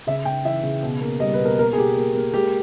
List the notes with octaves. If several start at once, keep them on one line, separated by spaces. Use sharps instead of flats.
C#3 E5
C#3 G5
E3 E5
C#3
B2
A#3
G3 D#5
B4
B2
A#4
A#3 A#4
G#4
A#3 G4
A#3
A#3
G#3 G4